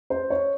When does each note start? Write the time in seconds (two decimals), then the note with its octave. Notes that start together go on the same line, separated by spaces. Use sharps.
0.10 C5
0.30 C#5